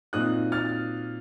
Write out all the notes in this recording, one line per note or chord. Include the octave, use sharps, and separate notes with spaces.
A#2 F#3 C4 D#4 D#6 F#6
F6 A6